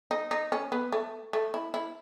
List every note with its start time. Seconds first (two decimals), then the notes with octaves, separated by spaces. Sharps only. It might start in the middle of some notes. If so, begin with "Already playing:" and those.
0.11 D#4
0.31 D#4
0.52 C#4
0.72 B3
0.92 A3
1.33 A3
1.54 E4
1.74 E4